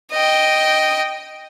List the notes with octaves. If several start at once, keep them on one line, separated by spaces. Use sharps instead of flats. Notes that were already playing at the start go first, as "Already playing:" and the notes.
D#5 G5